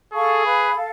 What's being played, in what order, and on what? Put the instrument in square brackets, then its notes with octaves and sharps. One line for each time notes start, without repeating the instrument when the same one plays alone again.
[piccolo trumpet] G#4 [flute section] A4 F5 A5 C#6
[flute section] B4 F5 B5
A4 F5